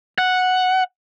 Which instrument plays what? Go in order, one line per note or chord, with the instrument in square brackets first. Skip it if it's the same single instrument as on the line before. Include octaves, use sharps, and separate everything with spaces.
[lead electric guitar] F#5